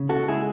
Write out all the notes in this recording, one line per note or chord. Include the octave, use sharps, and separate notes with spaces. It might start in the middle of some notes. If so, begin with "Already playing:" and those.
Already playing: C#3
C#2 F#4 A4
G#3 E4 G#4